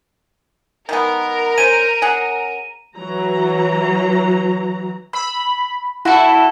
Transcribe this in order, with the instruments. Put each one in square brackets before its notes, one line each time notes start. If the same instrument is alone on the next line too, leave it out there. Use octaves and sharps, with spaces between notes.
[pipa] D#3 G#3 B3 [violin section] A#4
[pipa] C#4 C5 [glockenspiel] D#7
[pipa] C#4 G#4 F#5
[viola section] E3 F#3 A#5
[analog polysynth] B5 [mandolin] E6
[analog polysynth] E4 [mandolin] F#4 A4